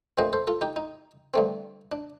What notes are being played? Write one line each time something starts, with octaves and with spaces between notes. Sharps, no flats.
A#1 A#2 A3 C4 C5 D#5
A4 C5
F4 A4
D#4 G4
D#4
G2 D3 A3 C4
D4